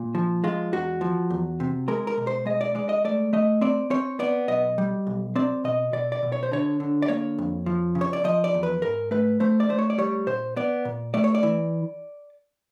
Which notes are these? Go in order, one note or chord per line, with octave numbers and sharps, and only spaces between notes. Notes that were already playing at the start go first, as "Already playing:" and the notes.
Already playing: A#2
F3
G#3 F4
E2 F#4
F3
E2
C3
G#3 A#4
A#4
B2
C5
G#3 D#5
D5
G#3 D5
D#5
A3 D5
A3 D#5
C4 D5
C4 C#5
B3 D5
B1 D#5
G3
B1
C4 D5
B2 D#5
B2 D5
D5
B2
C#5
C5
D3 C#5
D3
D5
A#3 C#5
F2
F3
C#3
C#5
D5
F3 D#5
D5
E2
B4
G#2 A#4
A3 B4
A3 C5
D5
A3 C5
C#5
D5
G3 C#5
A#2 C5
B3 D5
A#2
A3 D5
C#5
D5
E3